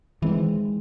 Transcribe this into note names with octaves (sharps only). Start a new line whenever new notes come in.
D#3 E3 G#3 C4